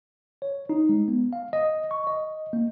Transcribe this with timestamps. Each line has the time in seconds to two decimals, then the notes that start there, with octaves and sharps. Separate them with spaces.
0.42 C#5
0.69 D#4
0.89 G#3
1.08 B3
1.33 F5
1.53 D#5
1.91 C#6
2.07 D#5
2.53 A#3